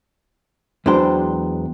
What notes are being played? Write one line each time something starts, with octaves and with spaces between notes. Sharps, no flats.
E2 F#3 G#3 D4 C5 G5